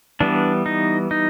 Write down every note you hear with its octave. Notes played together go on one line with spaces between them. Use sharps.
E3 G3 B3 D4
D#4
D#4